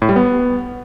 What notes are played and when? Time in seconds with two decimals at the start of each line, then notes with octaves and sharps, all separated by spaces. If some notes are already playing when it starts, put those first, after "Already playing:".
0.02 A2
0.09 G3
0.16 B3